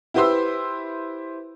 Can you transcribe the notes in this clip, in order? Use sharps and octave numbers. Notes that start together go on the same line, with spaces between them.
E4 G4 B4 C5 C6 E6